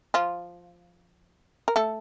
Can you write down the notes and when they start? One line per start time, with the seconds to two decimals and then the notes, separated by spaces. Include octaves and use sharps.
0.14 F3 F4
1.68 A#4
1.76 A3 A4